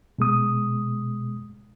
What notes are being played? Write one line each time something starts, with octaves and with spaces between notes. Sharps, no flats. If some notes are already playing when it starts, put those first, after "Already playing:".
B2 G#3 D#6